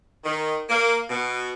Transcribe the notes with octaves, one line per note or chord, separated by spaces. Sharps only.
D#3
A#3
B2